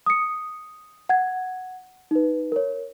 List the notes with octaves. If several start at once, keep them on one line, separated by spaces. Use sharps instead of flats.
D#6 C#7
F#5 G#6
D#4 B4
A#4 C#5